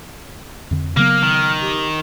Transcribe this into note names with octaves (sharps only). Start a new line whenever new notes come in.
F2 D3
C#3 F#3 A#3 B3 F6
D#3
G4